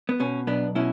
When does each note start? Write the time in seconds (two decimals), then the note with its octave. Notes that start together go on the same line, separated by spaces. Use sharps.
0.09 B3
0.20 B2 C#4
0.47 B1 B3 D4
0.75 B2 C#4 E4